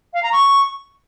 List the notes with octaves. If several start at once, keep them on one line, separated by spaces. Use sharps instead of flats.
F5
A#5
C#6